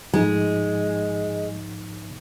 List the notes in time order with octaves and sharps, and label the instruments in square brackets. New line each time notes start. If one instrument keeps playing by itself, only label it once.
[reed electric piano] G#2 F3 D#4 [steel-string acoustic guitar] G#3